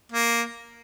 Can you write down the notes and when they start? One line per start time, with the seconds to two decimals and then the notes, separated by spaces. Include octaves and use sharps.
0.12 A#3